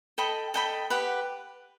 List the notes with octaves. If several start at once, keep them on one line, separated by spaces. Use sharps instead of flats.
A4 D#5 G5 B5
A4 D#5 G5 B5
G4 B4 F#5